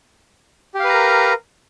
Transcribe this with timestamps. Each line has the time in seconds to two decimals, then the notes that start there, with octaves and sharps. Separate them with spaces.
0.75 G4
0.80 F5
0.84 B4
0.89 A#5
0.94 A#4